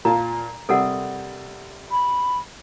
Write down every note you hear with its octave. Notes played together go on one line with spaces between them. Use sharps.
A#2 F4 A5 A#5
C3 G3 A4 A#4 F#5
B5